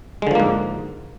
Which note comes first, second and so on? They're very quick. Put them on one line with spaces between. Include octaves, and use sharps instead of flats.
G#3 D3 F3 A#3 G#2